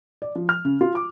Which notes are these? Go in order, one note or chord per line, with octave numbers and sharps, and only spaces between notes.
D5
F3
F6
C#3
F4
D6